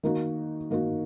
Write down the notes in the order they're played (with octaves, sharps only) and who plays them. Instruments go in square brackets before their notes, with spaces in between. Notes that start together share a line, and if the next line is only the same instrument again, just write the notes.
[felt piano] D#3 A#3 D#4 F#4
D#3 A#3 D#4 F#4